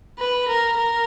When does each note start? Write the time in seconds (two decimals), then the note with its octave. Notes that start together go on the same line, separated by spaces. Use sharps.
0.19 B4
0.48 A#4
0.76 A#4